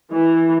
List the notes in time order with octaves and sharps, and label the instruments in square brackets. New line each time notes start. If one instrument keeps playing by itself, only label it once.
[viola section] E3